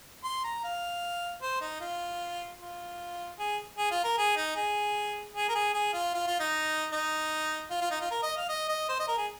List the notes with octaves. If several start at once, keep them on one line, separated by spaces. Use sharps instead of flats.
C6
A#5
F5
C5
D#4
F4
F4
G#4
G#4
F4
A#4
G#4
D#4
G#4
G#4
A#4
G#4
G#4
F4
F4
F4
D#4
D#4
F4
F4
D#4
F4
A#4
D#5
F5
D#5
D#5
C5
D#5
A#4
G#4